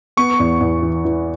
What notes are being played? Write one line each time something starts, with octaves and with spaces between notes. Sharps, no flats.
B3 C#6
E2
E2
E3
E3